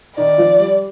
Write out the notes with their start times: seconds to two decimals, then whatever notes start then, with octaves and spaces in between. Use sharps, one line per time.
0.17 D#3 D#4 D5
0.38 F3 F4
0.59 G3 G4